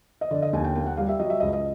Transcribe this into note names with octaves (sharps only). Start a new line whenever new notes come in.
D#5
D3 D5
D#5
D#2 G#5
G5
A#3 G5
F#5
G3 F5
E5
F#3 D#5
E5
C#2 D#5
D#5